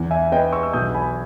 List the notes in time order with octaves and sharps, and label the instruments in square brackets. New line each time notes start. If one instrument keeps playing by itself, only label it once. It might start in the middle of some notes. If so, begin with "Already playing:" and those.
Already playing: [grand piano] E2
E5 G#5
B3 D#5 G5
C#6 E6
E6
B1 D#6 G6
G#5 B5